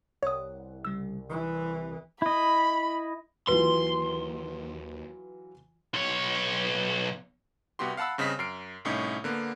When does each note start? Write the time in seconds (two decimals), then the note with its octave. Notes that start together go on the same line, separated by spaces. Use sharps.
0.23 C2 A#4 C#5 F#5 D#6
0.85 C#3 G3 E6
1.30 E3 C6 C#6
2.22 E4 D#5 B5
3.48 D#2 E3 F#3 F4 B4 C6
5.94 B1 C#5
7.79 C2 B3 F#4 G4 C6
7.97 F5 F#5 A5 B5 E6
8.18 G2 C#3 C4 D#5 B6
8.39 F#2 F6 C7 D7
8.85 C2 A2 C#4 D#4
9.24 D3 A#3 B3